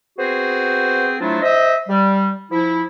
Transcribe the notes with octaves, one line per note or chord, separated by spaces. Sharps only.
B3 C4 F#4 G#4 C5
F3 F#3 A3 D4 E4 F4
C5 D#5 E5
G3
F3 E4